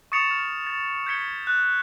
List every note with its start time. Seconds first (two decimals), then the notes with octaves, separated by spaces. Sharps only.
0.12 C#6 D#6 A6 C#7 E7 F7
0.31 F6
0.67 A6
1.06 G6 G#6 B6 C#7 G7
1.47 F#6